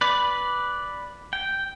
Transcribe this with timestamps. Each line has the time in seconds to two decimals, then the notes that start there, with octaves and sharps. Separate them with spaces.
0.01 B4 D5
1.33 G5